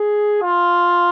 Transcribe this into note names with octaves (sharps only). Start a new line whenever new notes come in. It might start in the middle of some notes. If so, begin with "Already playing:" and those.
Already playing: G#4
F4